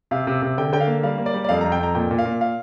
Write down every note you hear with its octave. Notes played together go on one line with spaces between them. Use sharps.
C3 F5
C3
C3
D3 G5
D3 G5
F5
A#3
G3 F5
A#3
D5
G3
D5
F2 F5
A#5
F2
G5
F2 A#5
A#2 G5
A#2
F5
A#2
F5